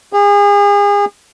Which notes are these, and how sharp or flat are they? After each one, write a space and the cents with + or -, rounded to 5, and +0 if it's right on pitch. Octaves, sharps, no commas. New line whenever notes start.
G#4 -35